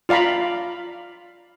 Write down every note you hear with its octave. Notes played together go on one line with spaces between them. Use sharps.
F4 D5 F5 A#5 B5